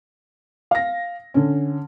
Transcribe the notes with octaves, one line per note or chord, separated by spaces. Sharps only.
F5 A#6
D3 C#4